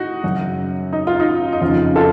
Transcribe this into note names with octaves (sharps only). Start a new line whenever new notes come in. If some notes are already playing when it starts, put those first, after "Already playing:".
Already playing: A2 D#4 F#4
F#2 C#3
D#4
F4
D#4
D#4
F2 C#3 F4
F4 A4